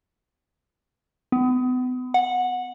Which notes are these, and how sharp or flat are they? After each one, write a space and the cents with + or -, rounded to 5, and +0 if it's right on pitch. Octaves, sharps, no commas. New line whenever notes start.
B3 +35
F#5 -15